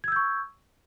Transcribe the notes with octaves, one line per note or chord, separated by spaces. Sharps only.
C#6 E6 G6 G#6